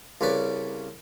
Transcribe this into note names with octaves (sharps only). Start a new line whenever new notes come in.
C2 C#3 C#4 B4 D5